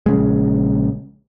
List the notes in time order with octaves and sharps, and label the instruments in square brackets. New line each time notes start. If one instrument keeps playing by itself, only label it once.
[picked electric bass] A#1 C#3 G#3